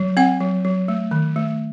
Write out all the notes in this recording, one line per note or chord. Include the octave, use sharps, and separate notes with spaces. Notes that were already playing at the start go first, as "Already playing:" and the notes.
Already playing: F#3
C4 F#5
F#3
F#3
A3
D#3
A3